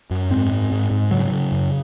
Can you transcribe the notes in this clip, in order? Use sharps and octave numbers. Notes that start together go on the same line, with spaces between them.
F#2
G#2 C4
G#2
G#2
G#2
C#3 F#3
C#3
F#2